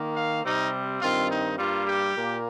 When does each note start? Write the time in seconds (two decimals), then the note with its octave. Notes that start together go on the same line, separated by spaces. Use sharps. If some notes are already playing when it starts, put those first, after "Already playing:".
Already playing: D#3 A#3
0.15 F5
0.43 C3 G3 C4 D#4
1.00 G2 D#3 C4 F4
1.29 D#4
1.57 G2 G3 A#3 F4
1.86 G4
2.15 A#2 A#3